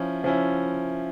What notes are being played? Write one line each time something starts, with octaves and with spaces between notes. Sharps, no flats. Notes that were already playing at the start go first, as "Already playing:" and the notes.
Already playing: F3 C#4 E4
F3 C#4 E4